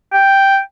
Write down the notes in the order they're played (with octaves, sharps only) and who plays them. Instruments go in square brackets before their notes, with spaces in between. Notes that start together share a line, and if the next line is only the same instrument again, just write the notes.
[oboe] G5